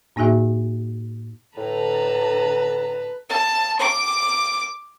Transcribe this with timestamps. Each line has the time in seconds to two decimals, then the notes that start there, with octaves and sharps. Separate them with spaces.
0.16 A2 A#3 D#4 F#4 G#4 E5
1.57 A2 D3 B4 A5 A#5
3.29 A5
3.79 D6